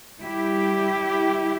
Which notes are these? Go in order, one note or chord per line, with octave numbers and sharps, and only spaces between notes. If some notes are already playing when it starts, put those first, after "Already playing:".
G3 E4 G4